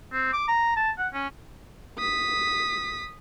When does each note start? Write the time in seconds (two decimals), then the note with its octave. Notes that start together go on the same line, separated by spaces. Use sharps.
0.12 C4
0.33 D6
0.48 A#5
0.76 A5
0.98 F#5
1.14 C#4
1.98 D#6 B6